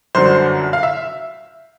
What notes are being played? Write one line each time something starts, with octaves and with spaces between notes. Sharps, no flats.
G1 F#2 D3 F#3 C5
F5
E5